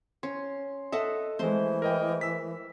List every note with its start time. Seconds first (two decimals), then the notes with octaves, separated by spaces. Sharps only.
0.23 C#4 C6
0.92 A4 D#5 E5 F#5
1.39 E3 G#3 A3 C5 C6
1.82 A#4 D#5 G5
2.21 E6 B6